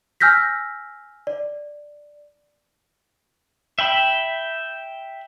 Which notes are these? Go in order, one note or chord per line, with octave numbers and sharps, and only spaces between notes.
G#5 E6 F6 G6 A#6 B6
D5
E5 G5 B5